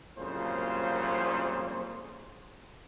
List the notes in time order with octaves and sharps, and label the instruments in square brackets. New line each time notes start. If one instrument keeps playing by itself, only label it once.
[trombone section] C2 F2 A#2 C#3 F#3 C5